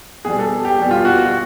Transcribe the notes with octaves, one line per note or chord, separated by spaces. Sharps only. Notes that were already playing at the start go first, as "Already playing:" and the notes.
B2 G3 G#4
A4
G4
B2 G3
F4
F#4
F#4